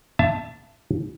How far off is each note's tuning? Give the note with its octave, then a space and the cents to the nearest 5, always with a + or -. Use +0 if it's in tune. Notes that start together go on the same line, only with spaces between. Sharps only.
E5 +35 A5 +0